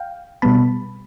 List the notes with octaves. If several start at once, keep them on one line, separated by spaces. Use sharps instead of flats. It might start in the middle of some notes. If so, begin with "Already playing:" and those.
Already playing: F5 G5
B2 G3 B3 A5 B5